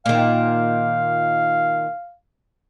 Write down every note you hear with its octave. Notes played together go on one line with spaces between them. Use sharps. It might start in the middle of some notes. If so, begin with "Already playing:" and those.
A#2 D#3 F5